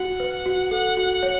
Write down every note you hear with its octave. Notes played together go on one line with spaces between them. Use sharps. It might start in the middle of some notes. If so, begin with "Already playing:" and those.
Already playing: F#4 F#5
B4
F#4
A4 F#5
F#4
C#5